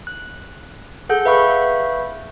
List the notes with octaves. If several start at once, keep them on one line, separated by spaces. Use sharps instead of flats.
F#6
G#4 A4 F#5 G6
B4 E5 F5 B5 C#6 G6